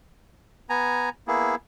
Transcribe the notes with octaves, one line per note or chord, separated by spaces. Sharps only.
B3 G#5 A#5
A#3 B3 E4 G#4